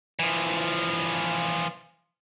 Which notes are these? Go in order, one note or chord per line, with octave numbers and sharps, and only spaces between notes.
E3 F3